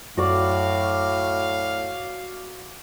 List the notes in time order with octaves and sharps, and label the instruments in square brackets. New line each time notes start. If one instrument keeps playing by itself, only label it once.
[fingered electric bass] F#2 [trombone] A2 [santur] F#4 D5 [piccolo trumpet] F5